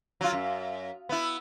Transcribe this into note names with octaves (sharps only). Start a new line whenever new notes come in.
F#3 F4
F#2
B3 E4